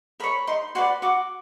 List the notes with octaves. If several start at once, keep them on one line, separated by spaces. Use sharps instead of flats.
A#4 C#5 B5
D#4 C6
F#4 B4 D5 C6
F#4 D6